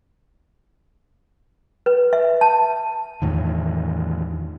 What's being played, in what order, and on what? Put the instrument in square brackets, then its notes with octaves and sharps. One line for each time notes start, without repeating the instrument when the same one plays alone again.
[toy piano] B4
E5
A5
[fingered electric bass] E2 A2 D#3